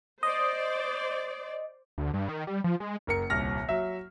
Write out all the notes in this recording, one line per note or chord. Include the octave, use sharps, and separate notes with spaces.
C5 D5 D#5
D2
G2
D#3
G3
F3
G#3
F#1 A#4 C#7
D#1 C2 F6 A#6
F#3 E5